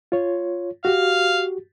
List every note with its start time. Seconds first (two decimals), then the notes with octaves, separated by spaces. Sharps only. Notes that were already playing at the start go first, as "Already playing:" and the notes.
0.12 F4 C#5
0.85 F#4 G4 F5